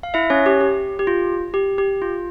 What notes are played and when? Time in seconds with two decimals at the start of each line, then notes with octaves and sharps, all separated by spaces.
0.03 F5
0.14 E4 E5
0.30 C#4 C#5
0.46 G4
0.61 G4
0.99 G4
1.07 F4
1.54 G4
1.78 G4
2.02 F4